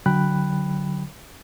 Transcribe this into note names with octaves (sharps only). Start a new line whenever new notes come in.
D3 F#3 G5 B5 F#6